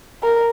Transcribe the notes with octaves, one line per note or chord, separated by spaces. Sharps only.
A#4